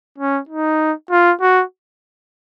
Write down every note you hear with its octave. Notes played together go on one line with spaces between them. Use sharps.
C#4
D#4
F4
F#4